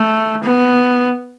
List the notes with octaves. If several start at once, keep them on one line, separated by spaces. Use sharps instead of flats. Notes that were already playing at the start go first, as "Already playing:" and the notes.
Already playing: A3
B3